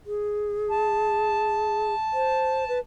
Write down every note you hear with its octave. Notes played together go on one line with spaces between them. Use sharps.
G#4
A5
C5
B4